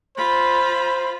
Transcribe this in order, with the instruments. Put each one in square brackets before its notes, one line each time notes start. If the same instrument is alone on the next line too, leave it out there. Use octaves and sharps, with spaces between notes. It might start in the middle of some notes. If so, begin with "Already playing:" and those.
[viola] F4 B5 [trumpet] C5